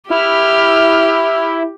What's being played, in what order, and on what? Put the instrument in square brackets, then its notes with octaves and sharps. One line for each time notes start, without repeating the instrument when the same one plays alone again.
[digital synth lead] E4 [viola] G4 [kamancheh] E5 F6